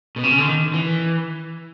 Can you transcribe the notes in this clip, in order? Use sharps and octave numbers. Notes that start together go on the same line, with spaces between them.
B2
C3
C#3
D3
D#3
E3